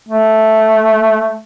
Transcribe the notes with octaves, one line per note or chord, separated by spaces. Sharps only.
A3